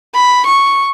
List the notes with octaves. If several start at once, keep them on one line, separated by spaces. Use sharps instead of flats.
B5
C#6